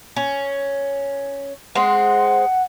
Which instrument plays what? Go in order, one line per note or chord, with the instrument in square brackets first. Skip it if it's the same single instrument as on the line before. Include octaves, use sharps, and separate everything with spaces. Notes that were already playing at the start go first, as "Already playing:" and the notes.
[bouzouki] C#4
[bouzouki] G#3 C4 [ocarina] F#5